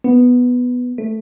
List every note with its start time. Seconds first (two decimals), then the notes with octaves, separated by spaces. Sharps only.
0.04 B3
0.98 A3